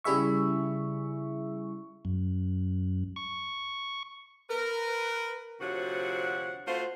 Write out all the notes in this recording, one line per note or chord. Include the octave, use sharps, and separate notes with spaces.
C#3 G3 E4 G#4 E5 C#6
F#2
C#6
A#4 B4
D2 C3 F3 F#4 C#5 F#5
A3 F4 F#4 C5